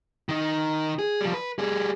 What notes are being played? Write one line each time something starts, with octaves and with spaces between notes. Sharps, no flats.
D#3 D#4
G#4
F3 G3
B4
G3 G#4